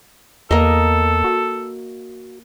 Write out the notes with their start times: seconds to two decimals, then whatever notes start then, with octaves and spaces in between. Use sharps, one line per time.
0.51 E2 A#3 A4 D#5
1.24 F#4